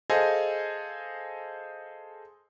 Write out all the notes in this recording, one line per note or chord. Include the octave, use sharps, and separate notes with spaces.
G#4 A4 C5 D#5 F5 G#5